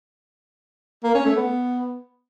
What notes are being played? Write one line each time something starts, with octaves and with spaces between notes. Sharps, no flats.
A#3
C#4
A3
B3